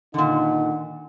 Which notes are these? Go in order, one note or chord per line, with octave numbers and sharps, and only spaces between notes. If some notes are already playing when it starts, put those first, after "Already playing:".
A#2 D3 D#3 D#4 F#5